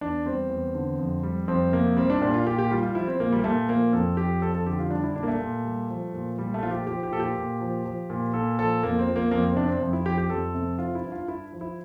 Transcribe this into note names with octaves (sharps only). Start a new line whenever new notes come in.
E2 D4
G3 C4
E2
D3
F2
G3
F2 C4
C3 A#3
G3 C4
D4
A#2 D4
F4
A#2 G4
G4
G3 F4
F4
F3 E4
C4
A#2 A#3
G3
A#3
A#2 A3
F3 A#3
F2 A4
F3 G4
F2 A4
A4
D3 G4
F4
G3 D4
E4
A#2 D4
A#3
A3
A#2
G3
F3
A#2
A#2 G3
A3
F3 F4
G4
F3 G4
G4
A#2 A4
G4
A#2
F3
F3
A#2
A#2 A4
F3 A4
F2 A#3
C4
F3
A#3
F2 A#3
C4
C3 D4
C4
F2
E4
F3 G4
G4
F2 A4
C3
F3 F4
E4
G2
F4
G2 E4
F3
E4